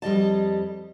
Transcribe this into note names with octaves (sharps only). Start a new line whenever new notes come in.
F2 G3 D#5 A5